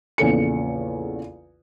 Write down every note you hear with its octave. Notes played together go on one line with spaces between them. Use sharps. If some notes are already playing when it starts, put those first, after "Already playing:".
A#1 E2 C#3 A4 C#7